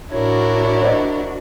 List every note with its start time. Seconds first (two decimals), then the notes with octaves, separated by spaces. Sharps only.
0.12 A2 D4 E4 F#4 A#4 C#5
0.83 C5 D5 D#5